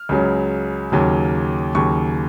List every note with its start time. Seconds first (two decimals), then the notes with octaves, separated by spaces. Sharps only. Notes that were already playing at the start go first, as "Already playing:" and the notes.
Already playing: F6
0.09 C#2 C#3 F#3
0.92 D#2 C#3 F#3
1.75 D#2 C#3 F#3 C#6